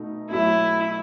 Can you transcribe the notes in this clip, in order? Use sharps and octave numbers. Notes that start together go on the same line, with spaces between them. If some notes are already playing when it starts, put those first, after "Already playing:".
Already playing: B2 A3 D#4
B2 F#3 A3 E4